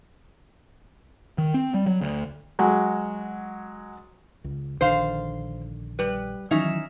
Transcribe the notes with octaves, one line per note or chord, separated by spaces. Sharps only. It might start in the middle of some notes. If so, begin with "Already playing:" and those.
D#3
C4
G3
F#3
D2
F#3 G#3 F#4
C#2
A#1 D3 D#3 C5 F5
G3 B4
D#3 E3 F#3 C#4 D#4 E5